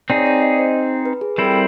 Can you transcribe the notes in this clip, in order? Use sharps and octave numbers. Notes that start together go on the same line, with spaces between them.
C4 D#4 G#4 D5
C#5
D5
D#5
C5
B4
G#4
G3 C4 E4 A#4
A4
A#4